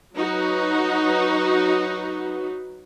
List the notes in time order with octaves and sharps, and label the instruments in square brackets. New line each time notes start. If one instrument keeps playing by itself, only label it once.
[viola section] F#3 D#4 F#4 B4